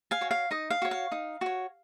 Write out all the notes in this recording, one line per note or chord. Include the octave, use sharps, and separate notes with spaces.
F5 G#5
F#4 C#5
F5
D#4 D#5
F5
F#4 C#5
F5
D#4
F#4 C#5